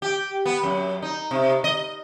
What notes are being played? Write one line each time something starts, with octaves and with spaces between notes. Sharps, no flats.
G4
B3
F#2
D#4
C3
D#5